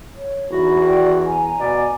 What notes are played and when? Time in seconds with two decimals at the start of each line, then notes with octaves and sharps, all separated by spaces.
0.14 C#5
0.51 E2 D#4 F#4 B5
0.86 B4 D5 G5
1.22 G#5 A#5
1.59 B2 D5